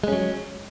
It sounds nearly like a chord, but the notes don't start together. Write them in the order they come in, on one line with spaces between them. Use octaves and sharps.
G#3 C#4 F#3